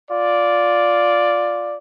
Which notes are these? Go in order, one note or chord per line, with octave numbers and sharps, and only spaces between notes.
F4 D5